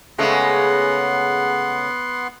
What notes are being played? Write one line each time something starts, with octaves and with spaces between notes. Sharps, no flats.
C#3 G#3 A3 B3 F#5 C6